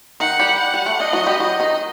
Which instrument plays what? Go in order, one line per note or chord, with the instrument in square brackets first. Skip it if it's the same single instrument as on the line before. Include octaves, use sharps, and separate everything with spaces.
[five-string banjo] D#3 D#4 [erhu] F#5
[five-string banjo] G3 G4
[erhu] F#5
[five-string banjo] G3
A3
[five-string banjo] D4 [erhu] D#5
[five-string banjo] F#3 F#4
G3 G4
[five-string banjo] F#3 F#4 [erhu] D#5
[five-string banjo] D#3 D#4